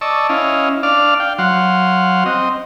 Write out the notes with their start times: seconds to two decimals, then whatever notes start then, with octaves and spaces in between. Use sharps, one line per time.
0.01 D5 D#5 A5 C#6 E6
0.29 C#4 E4 D#5 F5
0.83 D4 D5 F5 F6
1.20 F5 G5
1.39 F#3 F5 F#5 C6
2.26 C4 D#5